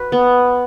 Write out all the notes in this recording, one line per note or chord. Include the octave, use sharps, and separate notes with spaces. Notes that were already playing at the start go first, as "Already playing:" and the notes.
Already playing: F#4 B4
B3